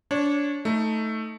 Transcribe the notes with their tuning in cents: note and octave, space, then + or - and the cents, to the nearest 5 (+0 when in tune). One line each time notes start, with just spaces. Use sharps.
D4 -25 C#5 -15
A3 +0 D#4 +15